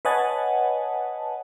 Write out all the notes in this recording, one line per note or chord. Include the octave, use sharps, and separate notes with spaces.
B4 C#5 D#5 F#5 G#5 A5